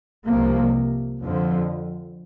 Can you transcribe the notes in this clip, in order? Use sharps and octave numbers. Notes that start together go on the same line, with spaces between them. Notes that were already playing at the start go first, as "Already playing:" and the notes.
C2 C3 F3 A#3
F2 D3 F3